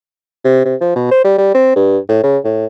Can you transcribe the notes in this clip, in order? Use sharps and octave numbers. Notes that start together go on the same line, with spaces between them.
C3
C3
F3
B2
C5
G3
G3
C4
G2
A2
C#3
A2